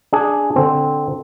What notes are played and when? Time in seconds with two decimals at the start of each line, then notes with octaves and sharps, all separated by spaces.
0.13 D4 G#4
0.56 D3 C4